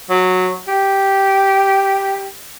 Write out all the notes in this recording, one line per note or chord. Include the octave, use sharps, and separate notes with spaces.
F#3
G4